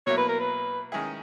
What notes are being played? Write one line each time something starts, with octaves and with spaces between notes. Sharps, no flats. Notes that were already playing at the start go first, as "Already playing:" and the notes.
B2 F#3 A#3 E4 C#5
B4
A#4
B4
D#3 G#3 C#4 E4 G#4